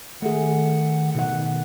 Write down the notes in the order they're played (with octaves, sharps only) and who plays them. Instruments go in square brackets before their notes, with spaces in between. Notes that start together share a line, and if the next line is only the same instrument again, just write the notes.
[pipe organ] D#3 F#5 [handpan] A3 G#4
[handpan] B2 D#3 F#5